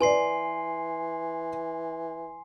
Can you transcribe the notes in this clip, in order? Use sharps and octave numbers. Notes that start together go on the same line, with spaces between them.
E3 B4 D5 G#5 C6 C7